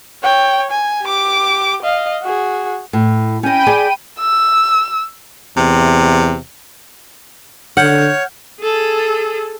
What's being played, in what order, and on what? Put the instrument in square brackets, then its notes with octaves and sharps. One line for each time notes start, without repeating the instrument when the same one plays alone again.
[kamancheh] C#5 G5
G#5
G4 D6
D#5 F5
F#4 G#4
[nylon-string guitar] A2
[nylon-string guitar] C#4 D#5 [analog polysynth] G5 B5 D#7
[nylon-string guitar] G#4 D5 G#5
[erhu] E6
[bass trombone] E2 [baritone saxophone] C3
[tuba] D3 [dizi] C#5 [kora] F#5 [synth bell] F6 G6
[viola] G#4 A4